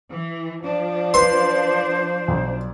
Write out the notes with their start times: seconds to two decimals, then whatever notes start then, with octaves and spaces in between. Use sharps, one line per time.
0.10 E3
0.63 F3 D4
1.14 B4 C5 C6
2.28 B1